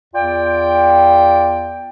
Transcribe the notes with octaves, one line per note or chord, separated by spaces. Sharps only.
E2 F4 D5 G5